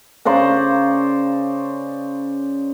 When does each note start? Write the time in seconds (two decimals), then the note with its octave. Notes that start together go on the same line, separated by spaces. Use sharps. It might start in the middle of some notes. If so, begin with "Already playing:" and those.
0.25 C#3 C5 D5 A#5